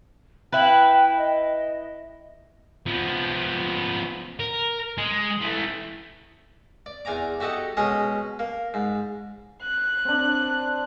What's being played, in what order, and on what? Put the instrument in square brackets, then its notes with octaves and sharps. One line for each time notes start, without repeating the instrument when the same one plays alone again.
[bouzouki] E4 B4 [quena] G5
[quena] D#5
[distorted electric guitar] F3 B3
A#4
G#3 G#4
E3 A3
[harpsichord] D5
E2 D5 G#5 A#5 D6
F#4 G4 A4 D#5 F#5
B2 G#3 C#4 D#5 D#6
A#3
G#2
[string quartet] F#6
[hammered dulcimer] C4 D4